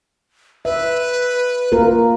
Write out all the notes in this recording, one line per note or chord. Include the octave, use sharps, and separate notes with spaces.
B4 E5
A#3 F4 A#4